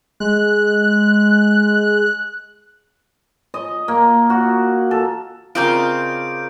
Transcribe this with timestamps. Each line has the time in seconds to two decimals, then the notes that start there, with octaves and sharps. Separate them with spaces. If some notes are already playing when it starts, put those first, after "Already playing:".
0.20 G#3 F#6
3.54 D#5
3.88 A#3
4.30 F#4
4.91 A4
5.55 C#3 C4 F4 A#4 D5 D#5 G6 D7